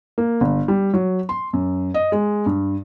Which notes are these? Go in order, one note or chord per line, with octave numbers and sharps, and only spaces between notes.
A#3
G1
G3
F#3
C6
F#2
D#5
G#3
G2